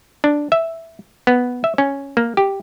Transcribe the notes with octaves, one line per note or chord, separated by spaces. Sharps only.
D4
E5
B3
E5
C#4
A#3
G4